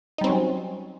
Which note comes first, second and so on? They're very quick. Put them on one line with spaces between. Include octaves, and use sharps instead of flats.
D#4 G3 C4 C#4 F#3